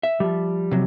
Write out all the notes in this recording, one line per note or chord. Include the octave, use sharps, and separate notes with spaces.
E5
F3 G3
C3 F#3